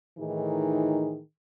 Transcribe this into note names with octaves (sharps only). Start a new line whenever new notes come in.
A2 D#3 E3 D#4 G#4